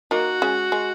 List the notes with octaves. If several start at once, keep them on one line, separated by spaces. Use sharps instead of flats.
A#3 D#4 F#4
G#3 C#4
G#3